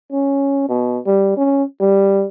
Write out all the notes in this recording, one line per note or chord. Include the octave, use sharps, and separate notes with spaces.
C#4
B2
G3
C#4
G3